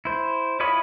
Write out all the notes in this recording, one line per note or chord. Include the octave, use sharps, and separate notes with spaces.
E4 C5
E4 F4 C#5 D#5 B5